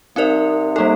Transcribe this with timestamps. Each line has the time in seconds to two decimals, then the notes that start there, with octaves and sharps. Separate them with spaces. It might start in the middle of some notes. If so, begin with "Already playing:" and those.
0.16 C2 C3 C4 D#4 A#4 D5
0.76 G3 A#3 D#4 A4